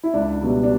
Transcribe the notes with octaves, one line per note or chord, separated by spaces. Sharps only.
E4
C#2 D4
B2 G3
D4